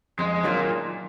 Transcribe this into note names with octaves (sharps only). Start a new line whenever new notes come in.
F2 G#3
A#2 D#3 F#3 D4 F4